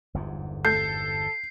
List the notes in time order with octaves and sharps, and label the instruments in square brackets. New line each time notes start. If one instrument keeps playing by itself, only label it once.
[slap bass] G1 E2 G#2
[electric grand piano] A4 [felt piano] G6 [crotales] C7